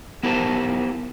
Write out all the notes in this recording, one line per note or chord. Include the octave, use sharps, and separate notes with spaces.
B3 E4 G4 A#4 C5 A5